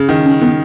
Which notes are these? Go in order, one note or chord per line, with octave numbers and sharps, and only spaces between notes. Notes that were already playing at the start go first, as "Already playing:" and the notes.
Already playing: C#3
D#3
C#4
D#3 B3